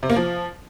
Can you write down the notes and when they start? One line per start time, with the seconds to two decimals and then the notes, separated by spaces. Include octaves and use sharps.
0.03 C3
0.10 A#3
0.16 F3